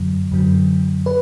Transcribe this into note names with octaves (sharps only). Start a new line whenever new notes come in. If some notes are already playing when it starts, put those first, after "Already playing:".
Already playing: F#2 D3 F#3
F#2 D3 F#3
B4